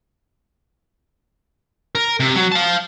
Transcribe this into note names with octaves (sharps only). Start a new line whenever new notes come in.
A#4
C3
F#3
F5 A5